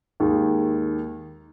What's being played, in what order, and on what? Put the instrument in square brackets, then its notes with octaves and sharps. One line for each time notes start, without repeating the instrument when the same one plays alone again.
[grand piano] D#2 D#3 G#3